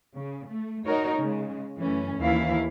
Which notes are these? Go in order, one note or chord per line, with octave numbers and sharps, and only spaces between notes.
C#3
A3
D#4 F#4 A#4 C#5
C#3 G#3
F#2 E3 A3 C#4
D#2 E3 E4 F5